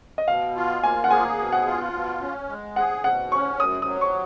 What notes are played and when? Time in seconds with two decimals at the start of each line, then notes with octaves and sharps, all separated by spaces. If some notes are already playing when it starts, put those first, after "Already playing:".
0.18 D#5
0.27 B2 F5
0.56 F4
0.83 A#3 G#5
1.04 F#5
1.10 G#4 G#5
1.38 B2
1.52 F#5
1.66 F4
1.93 B2
2.21 C#4
2.49 G#3
2.76 G#4 F#5
3.04 B2 F#5
3.32 C#4 C#6
3.59 F#2 D#6
3.82 D#6
3.87 F#3
4.01 C#6